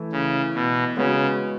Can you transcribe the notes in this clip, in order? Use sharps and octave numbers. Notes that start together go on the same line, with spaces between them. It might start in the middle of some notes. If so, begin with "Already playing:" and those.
Already playing: E3 A3 E4
C#3
B2
C#3 G#3 B3 F#4 C#5